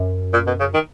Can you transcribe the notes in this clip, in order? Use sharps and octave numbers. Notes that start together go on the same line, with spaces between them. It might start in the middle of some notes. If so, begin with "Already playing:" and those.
Already playing: F#2
A#2
B2
C#3
D#3